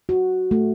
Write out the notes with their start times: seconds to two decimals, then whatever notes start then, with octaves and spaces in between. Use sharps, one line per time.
0.09 F#4
0.51 A3